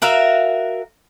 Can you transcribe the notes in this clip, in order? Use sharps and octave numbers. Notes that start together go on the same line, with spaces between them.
F#4 A#4 E5 F5